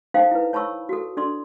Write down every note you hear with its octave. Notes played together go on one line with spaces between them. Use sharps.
D#4 A4 C5 F5 G5 A5
E4 B4
C#5 A5 B5 C#6 E6
F#4 A4
D4 A4 D5 C6